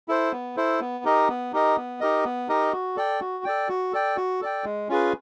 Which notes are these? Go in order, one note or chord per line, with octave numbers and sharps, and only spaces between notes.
E4 A4 C5
B3
E4 A4 C5
B3
D#4 G4 A#4 D#5
B3
D#4 G4 A#4 D#5
B3
D#4 G4 A#4 D#5
B3
D#4 G4 A#4 D#5
F#4
A4 D5 G5
F#4
A4 D5 G5
F#4
A4 D5 G5
F#4
A4 D5 G5
G#3
C#4 F4 G#4 B4